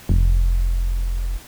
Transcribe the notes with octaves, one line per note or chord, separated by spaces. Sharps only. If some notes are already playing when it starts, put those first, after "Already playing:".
F1